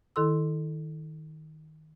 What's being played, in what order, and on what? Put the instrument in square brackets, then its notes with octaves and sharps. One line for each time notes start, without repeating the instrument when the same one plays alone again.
[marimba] D#3 E4 A4 C6 E6